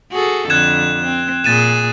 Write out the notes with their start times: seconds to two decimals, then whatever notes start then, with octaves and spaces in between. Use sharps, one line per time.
0.12 F#4 G#4 A4
0.50 F2 D3 F#6 G#6 E7
1.05 C4
1.44 A#2 G#4 A6 D#7 E7